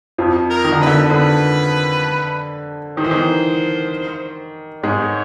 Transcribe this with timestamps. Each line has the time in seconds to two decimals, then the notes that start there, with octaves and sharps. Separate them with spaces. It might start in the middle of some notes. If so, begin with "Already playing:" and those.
0.18 F2 F3
0.50 A#4
0.65 D#3
0.72 D3
0.81 B4
0.87 D3
1.11 D3 B4
2.97 D#3 C5
3.04 E3
3.11 D#3
4.83 G#2 G#3 C#5